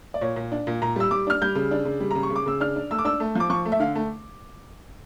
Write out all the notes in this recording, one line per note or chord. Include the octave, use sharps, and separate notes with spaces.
D5
A#2 C#5
A#2
D4
A#2
A#2 A#5
G3 E6
G3 D6
D4 F6
G3 G6
C#3
D4
C#3
G3
C#3 A#5
C#6
C#3
D6
C#3 E6
D4 F6
D4
A3 E6
D6
D4 E6
A3
F3 D6
F3 C#6
A3
E5
D3 F5
A3